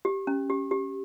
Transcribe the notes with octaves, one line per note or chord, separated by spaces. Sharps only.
G4
C#4
G4
G4